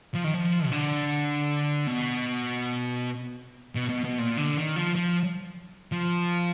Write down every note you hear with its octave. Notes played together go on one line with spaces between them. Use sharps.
F3
D#3
F3
B2
D3
B2
B2
B2
B2
A#2
D3
D#3
F3
F3
F3